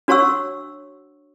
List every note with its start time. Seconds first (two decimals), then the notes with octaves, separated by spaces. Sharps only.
0.08 D4 F#4 C#5 F#5 C#6 E6